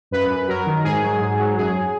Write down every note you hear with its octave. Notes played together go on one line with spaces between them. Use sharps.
F#2 B4
F#2
F#3 A#4
D#3
G#2 G#4
F#3
G#2
F#3
F#2 G#4